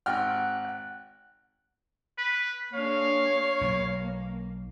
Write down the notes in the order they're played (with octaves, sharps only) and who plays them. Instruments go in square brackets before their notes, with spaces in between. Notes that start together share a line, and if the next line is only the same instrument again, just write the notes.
[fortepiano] G#1 G5 F6 [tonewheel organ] F#5
[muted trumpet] B4
[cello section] A#3 D4 G#4 [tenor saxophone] C#5 [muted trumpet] F5
[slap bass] B1 B2 [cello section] A#3